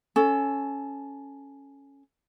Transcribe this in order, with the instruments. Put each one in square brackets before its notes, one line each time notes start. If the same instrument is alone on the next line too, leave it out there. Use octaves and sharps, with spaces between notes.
[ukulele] C#4 A4